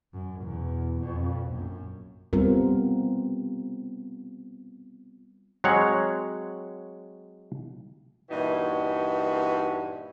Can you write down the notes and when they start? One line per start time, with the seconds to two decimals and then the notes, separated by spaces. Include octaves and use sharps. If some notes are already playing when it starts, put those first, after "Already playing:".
0.13 F#2
0.42 E2 B2
1.01 F2 B2
1.49 A#1 F#2
2.33 G3 B3 C4 F4 A#4
5.64 F#3 G#3 C4 C#5 F5 F#5
8.30 G2 A#2 E3 D#4 F#4